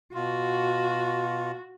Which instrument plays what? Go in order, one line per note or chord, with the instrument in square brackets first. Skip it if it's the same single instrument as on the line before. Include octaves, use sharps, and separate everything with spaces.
[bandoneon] B2 F4 [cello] F#4